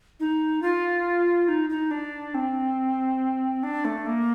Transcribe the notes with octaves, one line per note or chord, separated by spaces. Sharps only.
D#4
F4
D#4
D#4
D4
C4
D4
A3
A#3